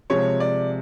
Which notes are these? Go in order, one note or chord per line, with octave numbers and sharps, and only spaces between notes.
C3 F3 G#3 C#5
D5